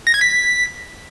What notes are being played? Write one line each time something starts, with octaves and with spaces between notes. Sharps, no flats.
A#6
G#6
B6